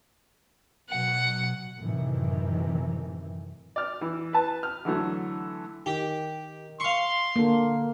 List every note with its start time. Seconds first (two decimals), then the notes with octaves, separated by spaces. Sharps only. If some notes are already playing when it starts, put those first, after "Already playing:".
0.89 B2 F#3 F#5
1.80 F#2 A2 C3 D#3 E3
3.76 D5 F6
4.01 E3
4.33 B4 A5
4.63 F6
4.85 D3 E3 F#3 A3
5.86 D#3 G4
6.80 F5 C6 C#6
7.36 D3 A#3 D4